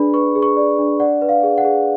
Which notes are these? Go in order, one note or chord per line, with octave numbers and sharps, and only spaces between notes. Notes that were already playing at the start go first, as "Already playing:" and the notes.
Already playing: D4 G#4 B4 D5 B5
B4 C#6
G#4
C#6
D5
D4
D5 F#5
B4
F5
G#4
F#5
G#4